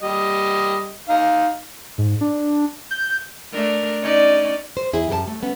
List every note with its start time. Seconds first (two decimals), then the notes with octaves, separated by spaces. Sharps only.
0.02 G3 D#5
1.09 D#4 F5
1.98 G#2
2.21 D4
2.91 G6
3.52 A3 D4 A#4
4.01 C#4 D#4 D5
4.77 C5
4.93 E2 E4 G#4
5.09 F#2 G4 A#4 A5
5.28 A3
5.42 A3 B3 C#4